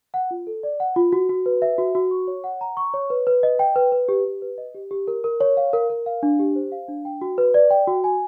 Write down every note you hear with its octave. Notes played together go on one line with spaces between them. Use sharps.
F#5
F4
A4
D5
F#5
F4
F#4
F#4
B4
E5
F#4
F#4
C#6
C#5
F#5
A#5
C#6
C#5
B4
B4
D#5
G5
B4
B4
G4
G4
B4
D#5
G4
G4
A#4
A#4
C#5
F5
A#4
A#4
F5
D4
G4
C5
F5
D4
G5
F#4
B4
D5
G5
F#4
G#5